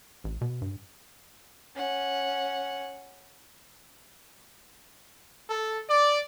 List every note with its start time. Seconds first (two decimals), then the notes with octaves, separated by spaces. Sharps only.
0.24 A1
0.41 B2
0.62 G2
1.75 C#4 F#5
5.50 A4
5.90 D5